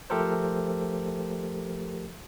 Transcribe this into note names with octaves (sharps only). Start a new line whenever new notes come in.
F3 A3 G4 A4 A#4 C5